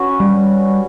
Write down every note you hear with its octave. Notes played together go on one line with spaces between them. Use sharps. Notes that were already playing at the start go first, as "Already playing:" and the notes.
Already playing: C#4 F#4 B4
G3